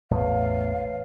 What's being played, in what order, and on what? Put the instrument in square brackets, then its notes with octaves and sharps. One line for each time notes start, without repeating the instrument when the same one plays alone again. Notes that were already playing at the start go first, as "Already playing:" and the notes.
[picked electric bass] A1 E2 A2 [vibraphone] B4 C#5 [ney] F5